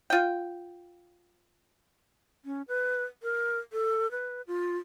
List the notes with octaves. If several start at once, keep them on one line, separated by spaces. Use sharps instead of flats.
F4 G5
C#4
B4
A#4
A4
B4
F4